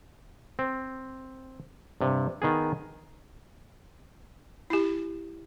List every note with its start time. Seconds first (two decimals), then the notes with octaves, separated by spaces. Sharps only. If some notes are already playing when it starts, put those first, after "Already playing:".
0.59 C4
2.01 G2 C3
2.42 D#3 B3 G#4
4.70 E4 G4